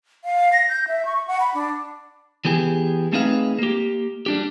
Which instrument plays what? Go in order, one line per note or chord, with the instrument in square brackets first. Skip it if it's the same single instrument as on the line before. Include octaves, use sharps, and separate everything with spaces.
[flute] F5
A#6
G6
E5
C#6
F#5
B5
D4
[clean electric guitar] E3 B3 G4 G#4
A3 C4 D#4 G#4 B4 F5
A#3 G4
G3 D4 G4